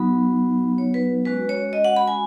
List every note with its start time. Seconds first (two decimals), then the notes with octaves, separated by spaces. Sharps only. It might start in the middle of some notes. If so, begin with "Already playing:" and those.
Already playing: F#3 B3 D#4 F#4 B5
0.78 C#5
0.94 B4
1.25 G#3 C#4 F#4 B4
1.49 C#5
1.73 D#5
1.84 F#5
1.96 B5
2.07 G#5